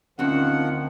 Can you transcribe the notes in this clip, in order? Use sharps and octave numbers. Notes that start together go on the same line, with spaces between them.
D2 D#3 F3 C4 C#4 F#5